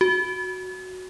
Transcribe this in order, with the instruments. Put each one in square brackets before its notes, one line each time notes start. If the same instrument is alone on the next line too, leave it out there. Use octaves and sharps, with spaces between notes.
[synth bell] F#4